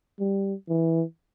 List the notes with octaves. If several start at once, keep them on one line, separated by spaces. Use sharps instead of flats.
G3
E3